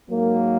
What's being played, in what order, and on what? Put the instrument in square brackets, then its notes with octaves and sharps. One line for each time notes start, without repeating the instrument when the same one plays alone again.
[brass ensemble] G#2 F#3 A#3